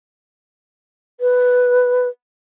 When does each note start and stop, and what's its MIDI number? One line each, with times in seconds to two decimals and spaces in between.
1.20 2.08 71